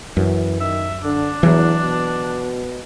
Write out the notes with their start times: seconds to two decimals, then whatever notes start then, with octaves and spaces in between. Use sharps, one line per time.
0.17 F#2 E3
0.60 D#3 E5
1.04 D3 D4
1.43 E2 E3 F#3
1.81 B2